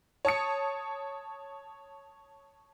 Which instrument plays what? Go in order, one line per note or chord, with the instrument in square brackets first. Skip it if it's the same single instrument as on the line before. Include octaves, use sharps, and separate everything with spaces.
[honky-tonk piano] C#5 A5 D#6 C#7